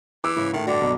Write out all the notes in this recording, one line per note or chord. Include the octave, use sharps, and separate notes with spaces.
E3 D6 E6
G#2 C#3 E4 C#6
A2 D#3
G2 D3 F#4 D5 D6
B1